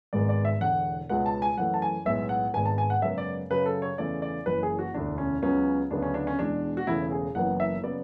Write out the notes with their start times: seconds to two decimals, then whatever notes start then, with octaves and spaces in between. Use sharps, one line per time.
0.13 G#1 G#2 G#3 B3 D5
0.29 D5
0.45 E5
0.61 E1 E2 D3 F#5
1.09 C#2 B2 G#3 B3 F#5
1.26 A5
1.42 G#5
1.57 F#2 E3 A3 F#5
1.74 A5
1.82 G#5
2.05 B1 A2 G#3 B3 E5
2.29 F#5
2.54 G#1 G#2 G#3 B3 G#5
2.66 A5
2.78 G#5
2.90 F#5
3.02 F#2 C#3 G#3 B3 E5
3.18 D5
3.50 F#2 C#3 F#3 B4
3.66 A4
3.82 C#5
3.98 E2 C#3 E3 A3 D5
4.22 D5
4.46 F#1 F#2 E3 B4
4.63 G#4
4.79 F#4
4.94 E1 D2 D3 D4
5.18 C#4
5.42 C#2 C#3 F#3 B3 C#4
5.91 D2 C#3 F#3 B3 D4
6.02 C#4
6.14 D4
6.27 C#4
6.39 E2 B2 G#3 D4
6.77 F#4
6.87 E1 E2 C#3 E3 A3 E4
7.12 G#4
7.35 F#1 F#2 E3 B3 F#5
7.60 E5
7.83 C#3 F#3 B3 D5